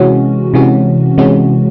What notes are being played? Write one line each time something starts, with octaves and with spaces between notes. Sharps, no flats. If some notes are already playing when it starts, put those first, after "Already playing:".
Already playing: C3 E3 G#3 C#4 F#4
C3 E3 G#3 C#4 F#4
C3 E3 G#3 C#4 F#4